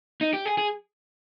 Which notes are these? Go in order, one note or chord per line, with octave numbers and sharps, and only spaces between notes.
D#4
G4
G#4
G#4